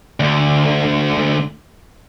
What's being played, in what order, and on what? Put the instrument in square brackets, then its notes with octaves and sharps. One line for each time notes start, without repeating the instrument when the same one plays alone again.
[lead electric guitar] D2 D3